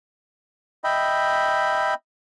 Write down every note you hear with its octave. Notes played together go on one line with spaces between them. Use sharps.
D#5 E5 G5 B5